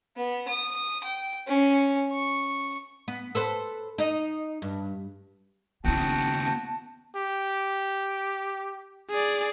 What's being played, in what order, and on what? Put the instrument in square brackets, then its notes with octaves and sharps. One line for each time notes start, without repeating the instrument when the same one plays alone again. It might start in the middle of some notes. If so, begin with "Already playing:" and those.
[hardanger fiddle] B3
D#6
G5
C#4
C#6
[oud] B3
A4 B4 C5
D#4 D#5
G2
[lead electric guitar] D#2 C#3 [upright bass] B3 E4 [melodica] F#4 F#5 G5 [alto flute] A5
[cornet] G4
[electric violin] G#4 D5